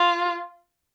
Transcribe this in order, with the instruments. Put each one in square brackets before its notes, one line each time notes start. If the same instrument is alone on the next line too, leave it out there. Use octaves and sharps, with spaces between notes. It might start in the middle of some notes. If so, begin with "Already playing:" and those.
Already playing: [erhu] F4